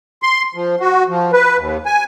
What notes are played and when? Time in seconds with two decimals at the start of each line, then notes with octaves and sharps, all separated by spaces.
0.23 C6
0.55 F3
0.80 F#4
1.08 F3
1.33 B4
1.58 D#2
1.86 G#5